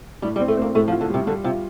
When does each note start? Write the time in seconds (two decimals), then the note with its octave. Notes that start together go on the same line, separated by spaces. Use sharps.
0.22 A2 G3
0.36 G3
0.40 C4
0.48 A3
0.57 A#3 C4
0.75 A2 A3
0.88 F3
0.92 F4
1.01 D3
1.10 C3 G3
1.27 D3 G3
1.44 C3 F4